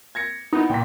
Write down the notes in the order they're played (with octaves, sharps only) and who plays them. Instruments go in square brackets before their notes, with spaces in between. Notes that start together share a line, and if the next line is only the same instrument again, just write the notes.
[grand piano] G#6 A#6 C#7
[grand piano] B3 E4 [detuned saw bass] D#4
[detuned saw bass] A#2 [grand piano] G5 B6